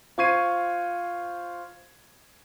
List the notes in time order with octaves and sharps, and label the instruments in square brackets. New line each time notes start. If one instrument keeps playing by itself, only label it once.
[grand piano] F4 C5 C#6 G#6 C7 D#7